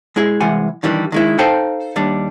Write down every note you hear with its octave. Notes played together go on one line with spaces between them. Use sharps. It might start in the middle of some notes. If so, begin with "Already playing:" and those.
G#3 E4 G#4
C2 E3 G#3 F#5 G#5
D#3 E3 G3 D4
D#3 G#3 E4
D#4 A4 C5 F5 G5 A5
D#2 G3 D4